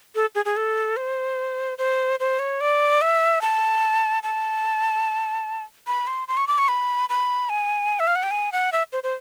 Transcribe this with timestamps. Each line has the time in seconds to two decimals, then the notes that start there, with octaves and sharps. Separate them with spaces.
0.15 A4
0.35 G#4
0.45 G#4
0.57 A4
0.97 C5
1.78 C5
2.20 C5
2.39 C#5
2.61 D5
3.02 E5
3.41 A5
4.23 A5
5.87 B5
6.07 C6
6.28 C6
6.37 C#6
6.47 D6
6.58 C#6
6.68 B5
7.09 B5
7.49 G#5
8.00 E5
8.07 F5
8.16 F#5
8.23 G5
8.31 G#5
8.52 F#5
8.72 E5
8.93 C5
9.03 C5